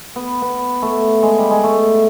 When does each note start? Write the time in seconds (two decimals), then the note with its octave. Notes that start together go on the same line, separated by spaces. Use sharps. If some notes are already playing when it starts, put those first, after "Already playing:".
0.16 B3
0.42 B3
0.82 A3
1.23 G#3
1.39 G3
1.51 G#3
1.64 A3